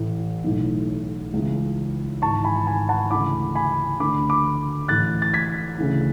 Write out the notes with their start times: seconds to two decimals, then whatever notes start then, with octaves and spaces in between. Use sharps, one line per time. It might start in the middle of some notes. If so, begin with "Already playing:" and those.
Already playing: A1 A2 E3
0.44 B1 A2 E3
1.33 C#2 C#3 E3
2.22 G#1 G#2 E3 A5 C#6
2.44 G#5 B5
2.67 G#5 B5
2.89 F#5 A5
3.11 D2 C#3 E3 B5 D6
3.55 G#5 B5
4.00 D2 D3 B5 D6
4.30 B5 D6
4.88 A1 A2 E3 F#6 A6
5.22 A6
5.33 G#6 B6
5.78 D2 C#3 E3